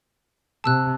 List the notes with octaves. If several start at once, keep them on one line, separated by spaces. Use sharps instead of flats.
C3 A5 E6 F#6